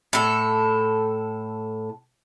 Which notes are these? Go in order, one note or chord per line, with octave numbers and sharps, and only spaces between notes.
A2 A4